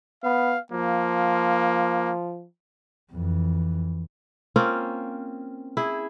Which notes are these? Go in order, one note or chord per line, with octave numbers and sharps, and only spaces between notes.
B3 F5
F3 A#3
F2 E3
A#3 C4 C#4 F4
E4 G#4